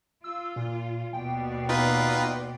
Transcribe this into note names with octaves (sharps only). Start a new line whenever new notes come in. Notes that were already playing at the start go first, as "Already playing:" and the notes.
F4 E6
A#2
D#2 B2 D5 G5
B3 D#4 F4 B4